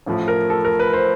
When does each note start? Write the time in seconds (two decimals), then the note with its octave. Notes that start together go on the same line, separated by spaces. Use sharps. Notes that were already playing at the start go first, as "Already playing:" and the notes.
0.06 A1 A2 F3
0.28 A#4
0.50 A4
0.65 A#4
0.79 B4
0.93 C5